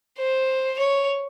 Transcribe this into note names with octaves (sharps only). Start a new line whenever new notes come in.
C5
C#5